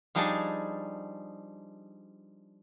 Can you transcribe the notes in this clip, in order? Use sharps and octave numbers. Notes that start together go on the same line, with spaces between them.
F3 G3 D4 D#4 G#4 A5